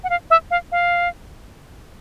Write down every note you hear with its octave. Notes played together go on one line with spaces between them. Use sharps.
F#5
F5
E5
F5
F5